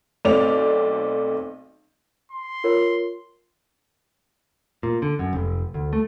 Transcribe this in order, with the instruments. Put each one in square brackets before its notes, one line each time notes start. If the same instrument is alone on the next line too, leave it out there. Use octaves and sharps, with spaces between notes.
[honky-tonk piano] B1 A3 C4 D5 F7
[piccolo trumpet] C6
[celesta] F4 A#4 C#5
[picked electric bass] A#2
D3
F#2
F1
D2
A3